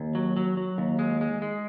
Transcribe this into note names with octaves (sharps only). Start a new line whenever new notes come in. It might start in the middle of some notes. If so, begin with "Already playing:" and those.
Already playing: D#2
F#3
F#3
F#3
D#2
G#3
G#3
G#3